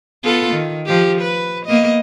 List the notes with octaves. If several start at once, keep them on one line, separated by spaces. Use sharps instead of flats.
B3 F4 A4
D#3
F3 G4
B4
A#3 B3 D#5